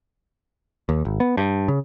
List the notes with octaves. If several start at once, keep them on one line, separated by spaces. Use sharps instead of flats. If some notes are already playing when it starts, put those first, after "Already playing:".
D#2
G#1
B3
G2
C#3